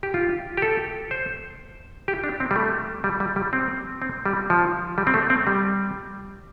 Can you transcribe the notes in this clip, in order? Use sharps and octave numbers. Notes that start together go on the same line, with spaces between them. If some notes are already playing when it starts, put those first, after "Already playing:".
G4
F4
G4
A4
C5
G4
D4
C4
G3
A3
G3
G3
G3
C4
C4
G3
F3
G3
C4
A3
C4
G3